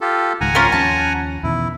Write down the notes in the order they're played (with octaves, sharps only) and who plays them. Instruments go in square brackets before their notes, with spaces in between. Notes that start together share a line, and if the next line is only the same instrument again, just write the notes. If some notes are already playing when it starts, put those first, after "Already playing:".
[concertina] F4 G4 A4
[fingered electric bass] C#2 G#2 D#3 [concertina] F#5 G#5 A#5
[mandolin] C#4 F4 A#4
[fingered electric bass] D#2 F3 C#4 [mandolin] A5
[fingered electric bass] E2 B2 D#3 [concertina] E4